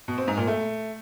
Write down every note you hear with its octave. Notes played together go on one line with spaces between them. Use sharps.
B2
C4
G#2
A#2
A3